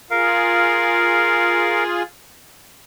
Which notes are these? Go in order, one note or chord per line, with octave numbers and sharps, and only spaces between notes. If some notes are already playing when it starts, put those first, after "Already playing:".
F4 G#4 A#4 F5